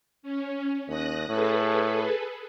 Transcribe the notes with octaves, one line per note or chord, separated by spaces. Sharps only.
C#4
D#2 D#6 F#6 A#6
A2 G#4 A4 B4